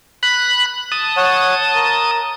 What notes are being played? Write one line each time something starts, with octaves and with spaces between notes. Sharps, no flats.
B5 F#6
A5 D#6
C#5 F#5
A#4